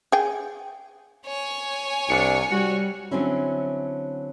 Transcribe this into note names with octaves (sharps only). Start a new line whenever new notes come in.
G#4 G5
C#5 G#5
C2 D4 C#7
G3 F#4
D3 F#3 C4 C#4 E4